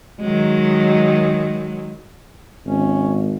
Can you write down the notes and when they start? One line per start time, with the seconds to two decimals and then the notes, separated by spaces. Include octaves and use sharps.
0.20 D#3 F#3 G#3
2.66 G#1 C#4